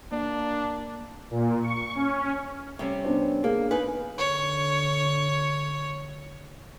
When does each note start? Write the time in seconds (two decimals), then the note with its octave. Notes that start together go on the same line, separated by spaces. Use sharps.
0.12 A#3 D4 D5
1.31 A#2
1.62 C#6
1.95 C#4
2.79 C3 G3 C#4
3.04 B3 D4 C5
3.44 A#3 D4 G#4
3.71 D#4 B4 G#5
4.18 D3 C#5